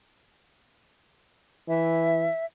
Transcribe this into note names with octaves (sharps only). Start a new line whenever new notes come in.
E3 E5